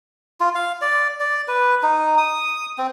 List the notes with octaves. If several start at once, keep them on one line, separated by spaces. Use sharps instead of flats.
F4
F5
D5
D5
B4
D#4
D#6
C4